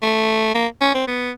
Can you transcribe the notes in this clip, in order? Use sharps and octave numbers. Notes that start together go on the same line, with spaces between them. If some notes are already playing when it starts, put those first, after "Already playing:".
A3
A#3
C#4
C4
B3